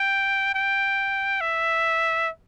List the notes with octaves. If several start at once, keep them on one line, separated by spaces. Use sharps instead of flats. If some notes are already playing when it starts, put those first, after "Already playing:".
Already playing: G5
G5
E5